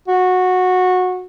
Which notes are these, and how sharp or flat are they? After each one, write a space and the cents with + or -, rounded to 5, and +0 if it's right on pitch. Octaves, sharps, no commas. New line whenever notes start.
F#4 -15